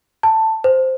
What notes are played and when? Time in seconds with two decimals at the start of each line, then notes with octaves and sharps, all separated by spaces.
0.23 A5
0.64 C5